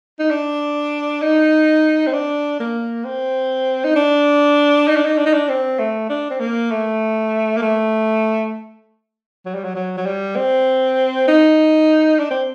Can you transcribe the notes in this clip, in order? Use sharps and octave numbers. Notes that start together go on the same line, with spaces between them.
D#4
D4
D#4
C4
D4
A#3
C4
D#4
D4
D#4
D4
D#4
D4
D#4
D4
C4
A3
D4
C4
A#3
A3
A#3
A3
F#3
G3
F#3
F#3
F#3
G3
C4
D#4
D4
C4